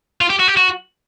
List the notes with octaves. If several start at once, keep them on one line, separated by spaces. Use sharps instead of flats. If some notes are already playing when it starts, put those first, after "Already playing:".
F4
G4
F#4
G4
F#4